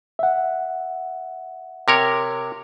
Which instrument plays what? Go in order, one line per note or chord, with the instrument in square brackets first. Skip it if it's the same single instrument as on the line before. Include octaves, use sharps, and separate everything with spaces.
[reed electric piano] E5 F#5
[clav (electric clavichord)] C3 A#4 C#5